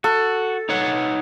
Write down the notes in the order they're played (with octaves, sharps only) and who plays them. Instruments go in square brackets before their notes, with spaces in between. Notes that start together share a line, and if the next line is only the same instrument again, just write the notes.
[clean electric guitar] F#4 [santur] A4
[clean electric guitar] D#4 C#5 F#5